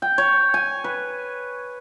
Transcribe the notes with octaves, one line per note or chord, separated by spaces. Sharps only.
G5
C#5
G#5
B4